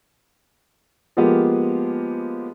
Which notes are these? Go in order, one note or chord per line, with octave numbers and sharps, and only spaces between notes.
F3 G#3 A#3 B3 F4 G4